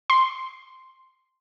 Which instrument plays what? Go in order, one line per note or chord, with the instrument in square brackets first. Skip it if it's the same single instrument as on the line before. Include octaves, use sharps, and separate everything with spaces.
[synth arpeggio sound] C6